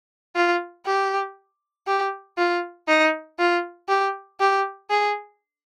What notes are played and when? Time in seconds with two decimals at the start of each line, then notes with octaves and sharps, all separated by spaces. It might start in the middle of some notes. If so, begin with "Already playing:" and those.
0.36 F4
0.86 G4
1.87 G4
2.38 F4
2.88 D#4
3.39 F4
3.88 G4
4.40 G4
4.90 G#4